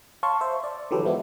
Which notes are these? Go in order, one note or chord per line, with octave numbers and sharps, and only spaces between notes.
C#5 F5 A5 C6 C#6
C5 E5
D5
D3 E3 F#3 G4 A4 B4
E3 F3 G#3 B3 E4